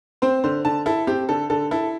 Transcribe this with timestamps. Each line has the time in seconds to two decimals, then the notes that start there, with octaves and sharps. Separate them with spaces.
0.22 C4 C5
0.44 D3 C5
0.65 D3 A5
0.86 E4 A4
1.07 C4 G4
1.29 D3 A4
1.50 D3 A4
1.71 E4 A4